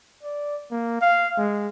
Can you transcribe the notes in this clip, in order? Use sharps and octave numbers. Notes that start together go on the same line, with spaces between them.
D5
A#3
F5
G#3